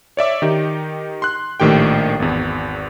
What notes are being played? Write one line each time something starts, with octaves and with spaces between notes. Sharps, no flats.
C#5 D5 E5 D6
D#3 D#4 G4
C6 F#6
A#1 A2 D#3 G4 G5
G#1 E2